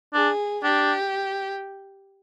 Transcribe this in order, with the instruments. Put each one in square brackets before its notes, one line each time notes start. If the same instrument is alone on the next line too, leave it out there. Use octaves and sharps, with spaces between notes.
[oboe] D4 [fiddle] G#4
[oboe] D4 [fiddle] G4